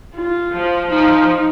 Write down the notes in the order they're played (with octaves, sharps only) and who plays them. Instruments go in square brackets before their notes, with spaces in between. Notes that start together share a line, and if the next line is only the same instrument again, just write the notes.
[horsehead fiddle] F4
[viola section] F3
[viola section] F3 [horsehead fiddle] D#4